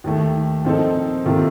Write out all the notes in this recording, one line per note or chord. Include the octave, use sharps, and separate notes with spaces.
D#2 D#3 A3
A#2 F3 C4 D#4 A4
C3 D#3 A#3 F4 A4